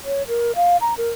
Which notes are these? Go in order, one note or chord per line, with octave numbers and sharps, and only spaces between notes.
C#5
A#4
F5
A#5
A#4